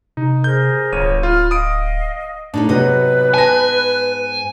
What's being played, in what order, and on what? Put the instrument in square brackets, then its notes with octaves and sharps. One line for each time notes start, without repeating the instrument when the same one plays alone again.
[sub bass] C3 [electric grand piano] D#4
[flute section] G#4 A#4 C5 [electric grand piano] G6
[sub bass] D1 [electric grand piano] G1 C#5 D#7
[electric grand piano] F4 [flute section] B5 F6
[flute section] D#5 F5 [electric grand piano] D#6 D7
[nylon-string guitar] A2 D#4 A4 [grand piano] D4
[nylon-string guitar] G#2 B3 D#5 [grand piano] C3 F#3 [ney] B4
[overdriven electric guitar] G#5 [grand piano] A5 A#6